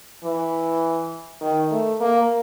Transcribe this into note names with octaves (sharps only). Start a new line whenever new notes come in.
E3
D#3
A3
A#3